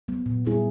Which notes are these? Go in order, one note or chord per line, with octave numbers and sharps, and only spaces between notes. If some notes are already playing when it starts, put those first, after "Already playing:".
F#3 B3
A#2
G3 C4 E4 G#4